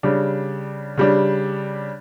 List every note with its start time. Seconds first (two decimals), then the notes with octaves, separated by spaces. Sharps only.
0.03 C#3 G3 D4
0.97 C#3 G3 D4